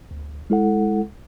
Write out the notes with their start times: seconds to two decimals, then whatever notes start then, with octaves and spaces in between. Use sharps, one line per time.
0.11 D2
0.50 G#3 E4 A4 F#5